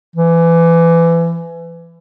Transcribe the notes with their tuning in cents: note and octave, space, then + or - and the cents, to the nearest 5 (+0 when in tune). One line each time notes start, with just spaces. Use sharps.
E3 +25